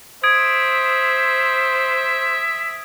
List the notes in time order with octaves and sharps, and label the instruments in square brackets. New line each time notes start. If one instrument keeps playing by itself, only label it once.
[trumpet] C5 [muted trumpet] E5 [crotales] D#6 G#6 D7